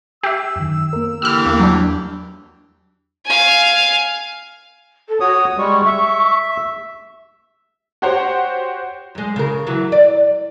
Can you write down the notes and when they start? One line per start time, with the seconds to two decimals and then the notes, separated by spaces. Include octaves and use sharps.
0.23 G4 E5 E6
0.56 F#2 D#3
0.93 A#3 A#4
1.22 D3 E3 G4 E6 F6
1.46 E2 A#3
1.60 F#3 D4
3.26 F5 G#5
5.08 A4
5.20 F#4 C#5 D#6
5.57 G3 G#3 C#6
5.85 E5
8.02 F#4 G4 C5 C#5 F#5
9.15 F#2 G#3
9.36 C#3 A#4
9.67 E3 F#3
9.92 D5